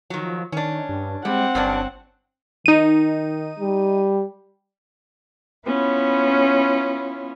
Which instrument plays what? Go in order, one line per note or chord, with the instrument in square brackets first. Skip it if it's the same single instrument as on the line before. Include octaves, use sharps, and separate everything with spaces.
[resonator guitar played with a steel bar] D#3 F#3 [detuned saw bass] F3
[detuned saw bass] D#3 [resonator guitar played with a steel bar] C#4 D4
[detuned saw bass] G2
[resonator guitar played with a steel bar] G3 [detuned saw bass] G#3 [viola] C4 F#5
[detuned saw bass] G1 [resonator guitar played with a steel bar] G2 C#4 D4
[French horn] D#3 [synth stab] D#4 D#7
[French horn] G3
[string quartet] B3 C#4 E4 F4